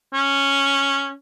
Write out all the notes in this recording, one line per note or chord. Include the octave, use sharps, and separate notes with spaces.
C#4